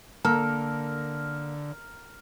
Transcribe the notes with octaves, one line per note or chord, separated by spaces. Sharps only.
D3 A#3 A4 A#4